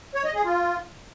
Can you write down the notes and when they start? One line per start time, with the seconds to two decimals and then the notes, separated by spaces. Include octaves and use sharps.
0.15 C#5
0.25 D#5
0.34 G#4
0.44 F4